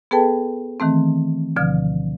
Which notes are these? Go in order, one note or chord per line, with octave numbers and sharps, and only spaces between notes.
B3 G#4 A4 B4 G5 A5
D#3 E3 A3 C4
D2 B2 D3 F3 F6